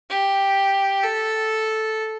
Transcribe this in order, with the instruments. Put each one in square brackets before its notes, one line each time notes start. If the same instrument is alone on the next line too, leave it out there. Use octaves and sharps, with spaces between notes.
[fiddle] G4
A4